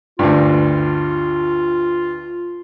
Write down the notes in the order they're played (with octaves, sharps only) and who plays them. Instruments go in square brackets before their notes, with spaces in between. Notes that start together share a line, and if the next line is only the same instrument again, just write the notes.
[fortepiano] D2 G2 [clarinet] F4